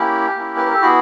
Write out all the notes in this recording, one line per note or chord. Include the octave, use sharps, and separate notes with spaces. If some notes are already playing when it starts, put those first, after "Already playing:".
Already playing: A#3 C#4 E4 G4
A#3 C#4 E4
B4
A#4
A4
B3 E4 F#4 G#4